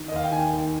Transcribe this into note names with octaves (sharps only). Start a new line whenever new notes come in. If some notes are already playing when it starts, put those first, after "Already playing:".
Already playing: D#3
D#5
D#2 F5
G5
D#3 G#5
D#2